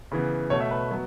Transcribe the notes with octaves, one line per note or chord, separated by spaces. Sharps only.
C#3 E3 B3
B2 A3 C#5
E5
B4
F#3 B3